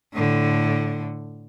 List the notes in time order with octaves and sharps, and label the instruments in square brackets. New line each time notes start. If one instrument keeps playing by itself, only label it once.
[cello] A2 D3